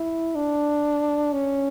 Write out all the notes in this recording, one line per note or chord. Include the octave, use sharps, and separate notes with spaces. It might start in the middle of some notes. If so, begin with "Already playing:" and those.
Already playing: E4
D4
C#4